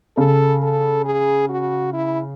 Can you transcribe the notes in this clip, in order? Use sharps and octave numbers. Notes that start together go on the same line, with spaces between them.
C#3 A4
A4
G#4
F#4
E4